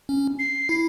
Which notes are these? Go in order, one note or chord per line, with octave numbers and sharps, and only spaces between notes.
C#4
C7
E4